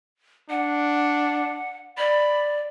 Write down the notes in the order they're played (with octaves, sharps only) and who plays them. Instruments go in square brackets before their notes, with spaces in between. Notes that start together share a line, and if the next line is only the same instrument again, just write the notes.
[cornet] D4 [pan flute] F#5
[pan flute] D5 [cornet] B5